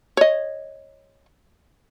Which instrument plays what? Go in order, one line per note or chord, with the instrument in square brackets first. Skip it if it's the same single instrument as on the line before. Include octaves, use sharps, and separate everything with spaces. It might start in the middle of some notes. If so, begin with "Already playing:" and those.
[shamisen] C#5 D#5